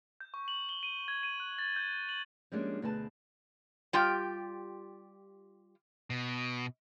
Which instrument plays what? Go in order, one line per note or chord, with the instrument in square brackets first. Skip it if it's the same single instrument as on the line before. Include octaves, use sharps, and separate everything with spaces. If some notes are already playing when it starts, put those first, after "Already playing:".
[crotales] G6
C#6
F#7
G7
D#7
G#6
D#7
F#6
A6
G6
G7
F#7
[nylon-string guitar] F3 G3 G#3 A#3 C#4 D4
D2 B2 D4 G#4 B4 A5
[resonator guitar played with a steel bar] G3 F4 G4 G5
[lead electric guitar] B2